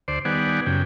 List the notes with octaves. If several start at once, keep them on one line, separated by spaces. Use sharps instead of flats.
D2 C5 D5
D#3 G3 B3 D5 F#5 G#5
F#2 C#3 G5